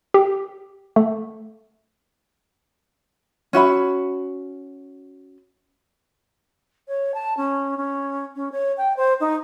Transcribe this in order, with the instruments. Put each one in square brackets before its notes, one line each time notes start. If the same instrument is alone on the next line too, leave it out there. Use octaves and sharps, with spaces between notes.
[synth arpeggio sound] G4
A3
[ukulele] C#4 F#4 E5 B5
[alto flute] C#5
A5
C#4
C#4
C#4
C#5
G5
C5
D#4